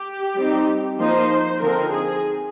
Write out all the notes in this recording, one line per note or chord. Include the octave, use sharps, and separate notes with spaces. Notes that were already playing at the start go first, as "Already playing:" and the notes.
Already playing: G4
G3 C4 D#4
F3 A#3 D#4 C5
D3 F3 C4 D#4 A#4
G#4